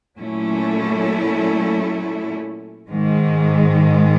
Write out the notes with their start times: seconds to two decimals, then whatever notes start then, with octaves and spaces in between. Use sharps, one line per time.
0.18 A#2 F#3 A3 C#4 E4
2.88 G#2 D#3 G#3